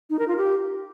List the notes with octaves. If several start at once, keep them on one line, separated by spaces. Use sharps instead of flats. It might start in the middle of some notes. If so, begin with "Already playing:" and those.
D#4
A#4
F4
G4